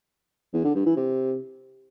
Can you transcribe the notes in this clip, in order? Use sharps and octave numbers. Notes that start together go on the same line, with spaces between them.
E2
D3
G2
E3
C3